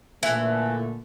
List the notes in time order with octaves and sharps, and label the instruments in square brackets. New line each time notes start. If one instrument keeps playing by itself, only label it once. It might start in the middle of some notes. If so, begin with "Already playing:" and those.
[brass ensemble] A#2 D3 A3 [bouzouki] E3